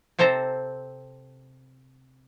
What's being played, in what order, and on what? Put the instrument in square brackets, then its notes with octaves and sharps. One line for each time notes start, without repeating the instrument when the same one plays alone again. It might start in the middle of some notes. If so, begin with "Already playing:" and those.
[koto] C3 C4 A4 C5 A#5